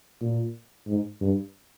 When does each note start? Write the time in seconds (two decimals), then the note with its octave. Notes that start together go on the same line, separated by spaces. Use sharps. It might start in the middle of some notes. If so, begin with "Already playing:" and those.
0.21 A#2
0.88 G#2
1.21 G2